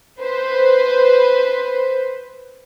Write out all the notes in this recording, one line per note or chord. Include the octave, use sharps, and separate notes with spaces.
B4 C5